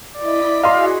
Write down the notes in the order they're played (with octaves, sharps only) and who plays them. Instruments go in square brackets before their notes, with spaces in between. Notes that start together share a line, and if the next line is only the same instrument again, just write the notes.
[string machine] E4 D#5 B6 [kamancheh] D5
[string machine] F#4 G#4 F#5 [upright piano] D#5 C6 [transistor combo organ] F5